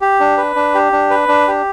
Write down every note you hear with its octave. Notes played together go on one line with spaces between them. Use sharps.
G4
D4
B4
D4
G4
D4
B4
D4
G4